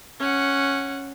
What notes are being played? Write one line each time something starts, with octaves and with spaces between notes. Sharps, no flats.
C#4 F#5